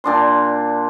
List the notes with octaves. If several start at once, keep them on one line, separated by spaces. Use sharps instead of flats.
A#2 D4 C6